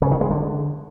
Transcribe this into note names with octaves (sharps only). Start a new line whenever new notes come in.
C#3
D#3
G#3
D3